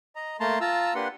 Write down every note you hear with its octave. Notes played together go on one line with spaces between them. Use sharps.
D#5 A#5
A3 A#3 A5 A#5 C6
F4 A5 A#5 E6
A#3 D4 G4 B4 F#5 C6